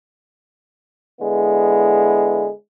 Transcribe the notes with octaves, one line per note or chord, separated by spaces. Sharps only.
D3 G#3 B3 E4